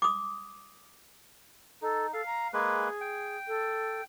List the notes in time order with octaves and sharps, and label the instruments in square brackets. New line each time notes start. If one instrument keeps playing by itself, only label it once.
[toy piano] D6 D#6
[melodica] D#4 [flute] A4
[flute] A4 [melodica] F5
[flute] A#5
[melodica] G#3 A#3 B4 [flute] G#4
[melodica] G5
[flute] A4